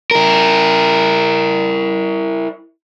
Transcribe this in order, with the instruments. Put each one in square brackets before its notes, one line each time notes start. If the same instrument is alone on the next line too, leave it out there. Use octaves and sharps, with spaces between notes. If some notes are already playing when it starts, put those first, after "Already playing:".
[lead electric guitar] E4 A#4